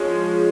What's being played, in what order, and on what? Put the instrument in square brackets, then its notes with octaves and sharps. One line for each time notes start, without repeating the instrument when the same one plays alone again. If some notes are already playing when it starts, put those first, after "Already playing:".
Already playing: [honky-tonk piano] F3 G#3 C#4